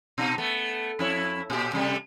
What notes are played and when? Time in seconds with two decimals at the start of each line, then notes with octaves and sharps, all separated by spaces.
0.18 B2 D#4
0.38 A3 B3
0.99 F2 E4 C#5
1.50 A#2 G4
1.73 C3 G3 A3